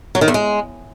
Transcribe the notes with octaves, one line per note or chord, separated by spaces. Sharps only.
F#3
D#3
E2
G#3